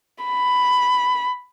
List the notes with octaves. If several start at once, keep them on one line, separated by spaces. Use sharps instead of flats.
B5